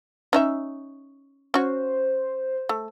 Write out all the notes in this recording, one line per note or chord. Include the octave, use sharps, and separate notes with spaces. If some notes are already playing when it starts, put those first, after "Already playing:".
C#4 D#4 E5
C#4 F#4 C5
A3